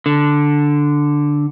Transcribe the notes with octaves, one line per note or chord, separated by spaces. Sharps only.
D3